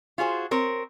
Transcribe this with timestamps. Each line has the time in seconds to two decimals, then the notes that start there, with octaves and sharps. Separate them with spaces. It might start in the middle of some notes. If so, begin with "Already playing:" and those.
0.18 F4 F#4 G#4 C5
0.51 C4 A#4 C#5